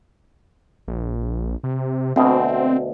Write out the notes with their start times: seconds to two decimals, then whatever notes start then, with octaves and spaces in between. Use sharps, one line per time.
0.88 A#1
1.63 C3
2.16 D2 B2 C4